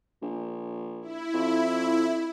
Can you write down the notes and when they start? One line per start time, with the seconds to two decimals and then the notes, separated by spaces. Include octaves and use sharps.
0.22 A#1
1.02 E4
1.34 F2